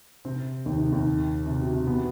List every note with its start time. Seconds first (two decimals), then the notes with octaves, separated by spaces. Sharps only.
0.25 C3 C4
0.66 D#2 D#3
0.78 C3
0.92 D#2 D#3
1.46 C3
1.60 B2
1.73 C3
1.87 B2 B3